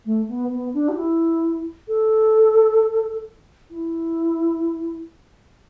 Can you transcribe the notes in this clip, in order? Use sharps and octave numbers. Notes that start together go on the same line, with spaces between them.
A3
B3
B3
D4
G4
E4
A4
E4